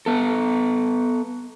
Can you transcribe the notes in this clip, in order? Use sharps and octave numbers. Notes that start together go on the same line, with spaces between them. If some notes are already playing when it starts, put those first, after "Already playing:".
B3 A4